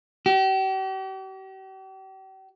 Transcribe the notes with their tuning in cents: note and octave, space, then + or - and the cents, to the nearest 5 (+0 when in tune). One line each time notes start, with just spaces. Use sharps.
G4 -40